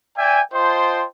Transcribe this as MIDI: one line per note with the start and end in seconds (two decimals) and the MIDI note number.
0.17 0.41 74
0.17 0.41 76
0.17 0.41 79
0.17 0.41 80
0.53 1.05 65
0.53 1.05 72
0.53 1.05 75
0.53 1.05 79
0.53 1.05 81
0.53 1.05 84